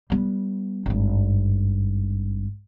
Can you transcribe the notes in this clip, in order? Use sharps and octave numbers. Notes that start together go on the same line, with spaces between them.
G3 B3
G#1 G2